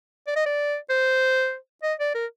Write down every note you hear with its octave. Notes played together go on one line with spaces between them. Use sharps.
D5
D#5
D5
C5
D#5
D5
A#4